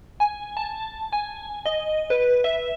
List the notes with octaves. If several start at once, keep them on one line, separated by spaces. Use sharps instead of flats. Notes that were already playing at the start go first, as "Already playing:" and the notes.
G#5
A5
G#5
D#5
B4
E5